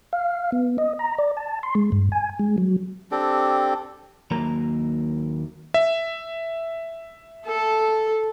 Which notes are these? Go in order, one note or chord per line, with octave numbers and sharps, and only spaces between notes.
F5
B3
D#5
A#5
D5
A5
C6
G#3
G2
G#5
G#3
F#3
C4 D4 G4 A4
D#2 F#3 A#3 A#4 A#5
E5
A4